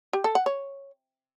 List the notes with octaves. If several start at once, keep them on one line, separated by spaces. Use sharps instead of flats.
G4
A4
F#5
C#5